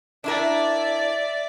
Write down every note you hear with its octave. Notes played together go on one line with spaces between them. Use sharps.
D4 E4 A#4 D5 E5